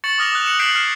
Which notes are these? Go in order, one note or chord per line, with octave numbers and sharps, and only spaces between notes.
C#6 A6 C#7 F#7
D6 D#6 F6 A#6 E7 F7
D#6 F#6
C#7 E7 F#7
G6 B6 C7 D7 F#7
F6 C7